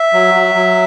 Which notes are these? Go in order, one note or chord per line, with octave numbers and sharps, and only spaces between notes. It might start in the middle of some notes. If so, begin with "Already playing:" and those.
Already playing: E5
F#3
F#3
F#3